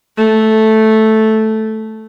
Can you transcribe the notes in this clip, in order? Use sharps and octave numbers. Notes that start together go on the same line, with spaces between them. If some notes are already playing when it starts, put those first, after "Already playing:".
A3